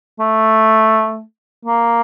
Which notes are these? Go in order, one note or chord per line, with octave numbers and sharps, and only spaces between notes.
A3
A#3